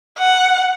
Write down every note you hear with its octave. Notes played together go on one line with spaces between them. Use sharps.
F#5